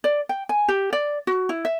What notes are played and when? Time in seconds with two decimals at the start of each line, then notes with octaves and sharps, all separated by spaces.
0.04 D5
0.29 G5
0.49 G#5
0.68 G4
0.93 D5
1.27 F#4
1.49 E4
1.65 E5